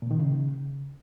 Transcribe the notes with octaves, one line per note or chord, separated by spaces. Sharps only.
A#2
D#3
C#3